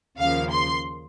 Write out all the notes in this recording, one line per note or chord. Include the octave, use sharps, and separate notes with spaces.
D#2 C#3 F3 A#3 F5
C6